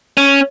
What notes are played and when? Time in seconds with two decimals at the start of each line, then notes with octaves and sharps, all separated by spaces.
0.17 C#4